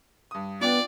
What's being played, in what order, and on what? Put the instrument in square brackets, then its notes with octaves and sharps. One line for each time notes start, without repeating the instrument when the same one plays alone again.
[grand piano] G2 D#6
[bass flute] B3 [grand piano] D4 F4 G5 [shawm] D5